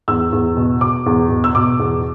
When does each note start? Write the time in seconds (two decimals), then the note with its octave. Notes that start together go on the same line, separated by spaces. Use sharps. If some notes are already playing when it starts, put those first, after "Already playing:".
0.08 E2 E6
0.32 E2
0.57 B2
0.81 B2 D6
1.06 E2
1.30 B2
1.44 E6
1.55 B2 D6
1.79 E2